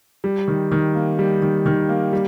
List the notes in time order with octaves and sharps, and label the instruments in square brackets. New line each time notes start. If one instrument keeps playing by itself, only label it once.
[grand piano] G3
D#3
D#3
A#3
G3
D#3
D#3
A#3
G3